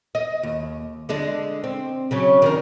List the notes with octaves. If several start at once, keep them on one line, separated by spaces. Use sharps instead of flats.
D#5
D#2
D3 G#3 D4
C4
C#3 F#3 C#4
D#3 D4 A#4